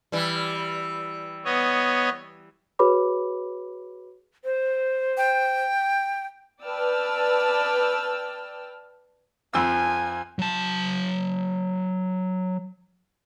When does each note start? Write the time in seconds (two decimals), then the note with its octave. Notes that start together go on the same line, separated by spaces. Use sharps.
0.12 E3 G3
1.45 B3 C#5 D#5
2.79 F#4 G#4 B4 C#5 B5 D6
4.44 C5
5.17 G5
6.64 B4 D5 G5 A5 E6 F6
9.54 F2 F3 G#5 E6
10.39 F#3 A5